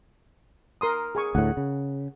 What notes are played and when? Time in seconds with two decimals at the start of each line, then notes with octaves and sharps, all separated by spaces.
0.81 A#4 C6 D#6
1.15 G#4 G#5 C#6
1.35 D2 A2 F#5
1.57 C#3